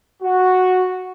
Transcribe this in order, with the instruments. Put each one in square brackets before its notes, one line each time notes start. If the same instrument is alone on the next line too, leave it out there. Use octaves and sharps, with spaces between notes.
[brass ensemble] F#4